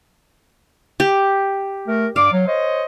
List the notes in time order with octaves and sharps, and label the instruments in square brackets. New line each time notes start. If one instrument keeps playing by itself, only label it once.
[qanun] G4
[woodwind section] A3 A#4
[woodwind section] G2 D5 D6 [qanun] F5
[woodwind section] F#3
C5 C#5 D#5